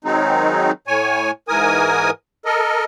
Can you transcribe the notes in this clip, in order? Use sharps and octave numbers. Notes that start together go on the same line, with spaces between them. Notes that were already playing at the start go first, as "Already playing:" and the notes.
D#3 F#3 G#3 C4 D#4
A2 C#5 G#5
G#2 E3 A#4 G#5 D#6
A4 A#4 D#5